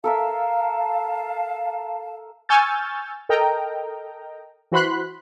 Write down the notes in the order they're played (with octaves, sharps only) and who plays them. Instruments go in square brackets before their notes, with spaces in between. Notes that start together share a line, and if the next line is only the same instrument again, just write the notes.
[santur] A4 A#4 E5 [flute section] F5 A5
[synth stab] G#5 C#6 E6 F6 G6 A6
A4 A#4 D#5 G5 A#5
E3 F#4 C5 B5 C6 F#6